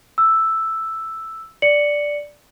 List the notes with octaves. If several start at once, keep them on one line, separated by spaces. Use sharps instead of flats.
E6
D5 C#7 F#7